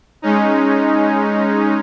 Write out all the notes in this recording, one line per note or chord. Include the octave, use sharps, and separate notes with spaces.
G#3 C#4 D#4